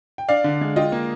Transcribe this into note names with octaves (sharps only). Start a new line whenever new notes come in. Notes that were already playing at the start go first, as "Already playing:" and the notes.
G5
D4 D5 F5
D3
G#3
F4 D#5 G5
A#3